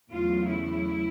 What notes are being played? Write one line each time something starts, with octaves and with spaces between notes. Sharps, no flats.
E2 C#3 F#3 A3 F4
E4